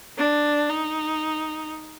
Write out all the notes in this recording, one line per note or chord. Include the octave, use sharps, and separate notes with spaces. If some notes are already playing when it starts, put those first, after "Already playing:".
D4
D#4